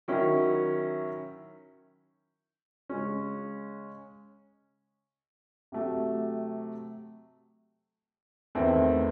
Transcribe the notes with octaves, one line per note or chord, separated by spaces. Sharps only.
D#3 F#3 C#4 E4
C#3 G#3 C#4
C3 F#3 A3
E2 D#3 A3 C4 E4